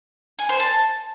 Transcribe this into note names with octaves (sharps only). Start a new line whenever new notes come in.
G#5
C5
A5